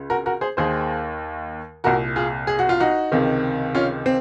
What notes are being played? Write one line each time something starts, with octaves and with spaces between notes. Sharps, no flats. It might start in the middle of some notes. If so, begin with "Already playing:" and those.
Already playing: C#2 C#3
F#4 A#4
F#4 A#4
G#4 C5
D#2 D#3 G#4 C5
C2 A#2 F#4 A#4
F4 G#4
G#4
F#4
F4
D#4 F#4
C#2 C3 D#3
C#4 F4
C4